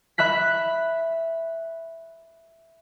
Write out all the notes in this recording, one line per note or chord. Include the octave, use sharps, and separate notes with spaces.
E5 B5 F#6 B6